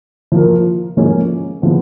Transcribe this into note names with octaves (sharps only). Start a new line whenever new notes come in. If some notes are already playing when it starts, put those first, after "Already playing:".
F3 A#3 F4 A#4
G#2 F3 A#3 C#4 G#4
C#3 F3 B3